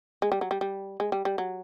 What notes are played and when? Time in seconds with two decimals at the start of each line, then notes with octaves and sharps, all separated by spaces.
0.22 G#3
0.32 G3
0.41 F#3
0.51 G3
0.61 G3
1.00 G#3
1.12 G3
1.25 G3
1.38 F#3